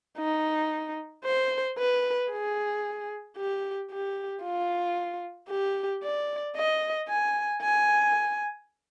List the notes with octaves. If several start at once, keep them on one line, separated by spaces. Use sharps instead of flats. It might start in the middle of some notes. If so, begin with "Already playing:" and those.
D#4
C5
B4
G#4
G4
G4
F4
G4
D5
D#5
G#5
G#5